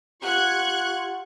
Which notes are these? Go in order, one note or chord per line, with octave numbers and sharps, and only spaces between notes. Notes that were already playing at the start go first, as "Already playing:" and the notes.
F4 G4 F#5 C#6 F#6 G#6